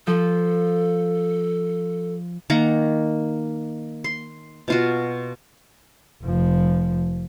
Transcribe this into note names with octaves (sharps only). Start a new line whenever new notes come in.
F3 A4
D#3 A#3 F#5 A#5
C6
B2 F4 F#4
F1 F3